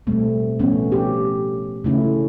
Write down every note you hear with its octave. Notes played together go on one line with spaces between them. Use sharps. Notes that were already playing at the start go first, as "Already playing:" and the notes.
B2 G3 A3 C4
F3 A3 B3 C#4
G4
C#3 E3 A3 C#4 E4